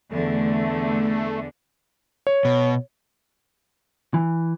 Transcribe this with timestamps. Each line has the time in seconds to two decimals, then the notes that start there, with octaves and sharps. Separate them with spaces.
0.12 E2 D3 A3
2.27 C#5
2.45 B2
4.14 E3